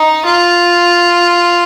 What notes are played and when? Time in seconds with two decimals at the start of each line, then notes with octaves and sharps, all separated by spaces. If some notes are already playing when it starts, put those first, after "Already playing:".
Already playing: D#4
0.25 F4